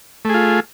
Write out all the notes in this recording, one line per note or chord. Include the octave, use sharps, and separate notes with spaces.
A3 F4 G#4